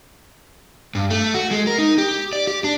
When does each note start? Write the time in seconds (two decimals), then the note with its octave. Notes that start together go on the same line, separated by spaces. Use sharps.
0.95 G2
1.10 A3
1.34 F#4
1.51 G#3
1.67 A#4
1.79 D#4
1.98 G4
2.33 D5
2.47 G4
2.64 D4